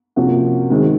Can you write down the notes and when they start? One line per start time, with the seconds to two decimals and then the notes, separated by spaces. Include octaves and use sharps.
0.16 C3 F3 A#3 C#4 F#4
0.70 D#3 G#3 C4 F#4